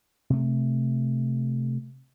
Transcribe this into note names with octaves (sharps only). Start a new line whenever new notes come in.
C3 A3